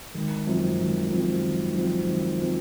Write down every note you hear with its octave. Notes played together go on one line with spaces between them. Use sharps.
G#1
F#2 F3 C4
G#1
F#2 F3 C4
G#1
F#2 F3 C4
G#1
F3 C4